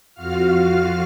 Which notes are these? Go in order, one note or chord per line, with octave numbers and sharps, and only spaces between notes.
F2 F4 F#4 F5 F6